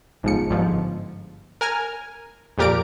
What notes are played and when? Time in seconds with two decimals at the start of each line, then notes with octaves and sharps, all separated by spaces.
0.23 G1 G#2 F3 C#7
0.50 G1 G#2 F3
1.61 A#4 G#5 F6 G#6
2.58 F2 A#2 G4 A#4 D5 D7